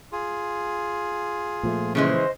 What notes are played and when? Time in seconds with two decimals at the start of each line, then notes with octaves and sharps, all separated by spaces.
0.12 F4 G#4
1.63 A#2 F3 A3
1.95 C#3 E3 G#3 C5 D#5